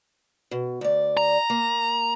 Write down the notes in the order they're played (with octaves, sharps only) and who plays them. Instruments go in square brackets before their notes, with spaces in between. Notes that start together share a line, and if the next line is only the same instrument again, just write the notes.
[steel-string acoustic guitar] B2
D2 D5
[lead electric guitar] A#5
[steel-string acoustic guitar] A#3